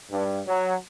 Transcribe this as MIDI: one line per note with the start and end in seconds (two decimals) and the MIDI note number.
0.11 0.41 43
0.47 0.75 54